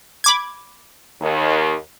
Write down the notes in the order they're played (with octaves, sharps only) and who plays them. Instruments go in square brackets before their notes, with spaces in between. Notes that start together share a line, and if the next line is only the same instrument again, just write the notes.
[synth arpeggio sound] B5 D6 G#6
[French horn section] D#2